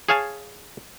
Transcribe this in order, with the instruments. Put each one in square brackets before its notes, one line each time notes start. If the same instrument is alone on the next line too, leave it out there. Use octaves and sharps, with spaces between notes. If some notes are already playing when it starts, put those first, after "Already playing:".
[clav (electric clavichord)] G#4 C#5 F5 G#5 A5